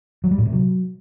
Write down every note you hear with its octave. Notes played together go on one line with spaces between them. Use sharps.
F#3
G3
A2
C3
F#3